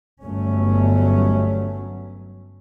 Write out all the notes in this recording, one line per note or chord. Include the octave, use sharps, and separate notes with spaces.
G1 F#3 A3 C#4